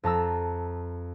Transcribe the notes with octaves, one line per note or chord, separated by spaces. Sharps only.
F2 A5 A#5 E6